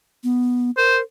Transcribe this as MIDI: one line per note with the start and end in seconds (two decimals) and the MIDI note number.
0.24 0.71 59
0.77 1.02 70
0.77 0.98 72